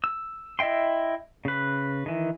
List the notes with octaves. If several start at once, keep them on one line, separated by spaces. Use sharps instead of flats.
E6
E4 D#5 E5 G5 C6
C#3 B4
D#3 E3